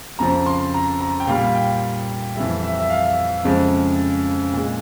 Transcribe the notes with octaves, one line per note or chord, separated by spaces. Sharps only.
F2 C#3 F3 A#5
C6
A#5
A#5
G5
A#2 G3 F5
G5
F2 E3 G3 E5
E5
E5
F5
F2 C#3 F3 G#3
A#2 G#3